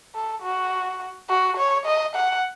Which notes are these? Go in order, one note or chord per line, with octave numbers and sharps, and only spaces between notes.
A4
F#4
F#4
C#5
D#5
F#5